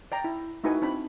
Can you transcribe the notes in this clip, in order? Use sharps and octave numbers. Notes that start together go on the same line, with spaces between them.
D5 G5 A#5
E4
A3 D#4 E4 F#4 B4 G#5
C4 D4 B5